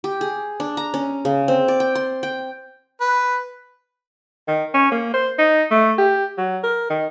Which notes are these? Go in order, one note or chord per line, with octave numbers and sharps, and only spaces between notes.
G4
G#4
D4
A#5
C#4
C#3
C4
D5
G5
C6
G5
B4
D#3
C#4
A#3
C5
D#4
A3
G4
F#3
A#4
D#3